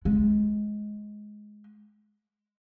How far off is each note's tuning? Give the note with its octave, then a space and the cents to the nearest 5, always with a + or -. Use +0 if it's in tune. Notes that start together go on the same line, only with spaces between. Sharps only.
G#3 +15